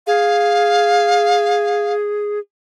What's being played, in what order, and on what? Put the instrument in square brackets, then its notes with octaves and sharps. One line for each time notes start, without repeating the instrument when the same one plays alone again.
[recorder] G#4 [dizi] F5